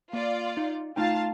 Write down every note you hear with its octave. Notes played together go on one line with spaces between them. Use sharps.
A#3 F4 D5
D#4
A3 D#4 F4 F5 G5 A5